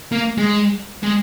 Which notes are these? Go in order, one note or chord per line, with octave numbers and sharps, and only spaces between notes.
A#3
G#3
G#3